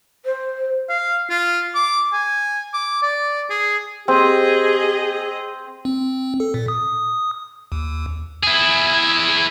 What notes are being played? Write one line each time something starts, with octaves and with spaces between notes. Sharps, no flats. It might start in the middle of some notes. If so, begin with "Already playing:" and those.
C5
F5
F4
D6
G#5
D6
D5
G#4
C4 G4 G#4 D#5
C4
A4
A#2
D#6
D#2
E4 G#4